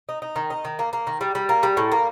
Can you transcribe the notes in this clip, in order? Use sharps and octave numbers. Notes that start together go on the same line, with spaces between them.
D#4
D#4
D#3
D#4
D#3
A#3
A#3
D#3
G3
G3
A#3
G3
A2
A#3